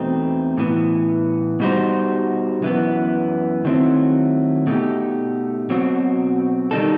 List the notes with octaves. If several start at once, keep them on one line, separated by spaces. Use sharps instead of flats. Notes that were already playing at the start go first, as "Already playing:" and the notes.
Already playing: E2 B2 A3 C4 D#4
A2 E3 B3
B2 G3 D#4 F#4 C5
F#2 E3 B3
D#3 F#3 A3 C4 E4
B2 A3 D#4 G4
B2 F#3 C4 F#4
D#3 G3 B3 D#4 A4